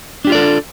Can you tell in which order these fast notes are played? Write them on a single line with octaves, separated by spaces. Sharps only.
D4 G4 F4 D5 A4